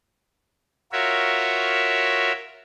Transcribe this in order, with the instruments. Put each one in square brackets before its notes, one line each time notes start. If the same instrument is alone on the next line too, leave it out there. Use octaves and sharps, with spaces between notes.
[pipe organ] F4 F#4 A#4 C#5 E5